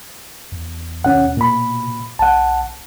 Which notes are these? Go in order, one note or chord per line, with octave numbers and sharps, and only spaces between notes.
E2
D#2 B2 C#4 F#5
A#2 B5
B1 F#5 A5